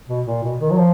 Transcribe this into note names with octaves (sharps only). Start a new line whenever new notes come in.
B2
A#2
B2
D#3
F#3
F3